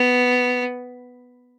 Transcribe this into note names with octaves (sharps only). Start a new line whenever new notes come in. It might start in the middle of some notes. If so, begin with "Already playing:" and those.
Already playing: B3